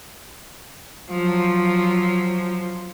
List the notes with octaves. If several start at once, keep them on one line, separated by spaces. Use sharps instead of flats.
F3 F#3